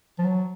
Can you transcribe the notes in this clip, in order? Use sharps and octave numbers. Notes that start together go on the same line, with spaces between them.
F3
F#3